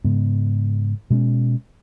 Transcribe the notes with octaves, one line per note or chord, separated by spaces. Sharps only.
G#2 C#3 G#3 B3
B2 G#3 C4 C#4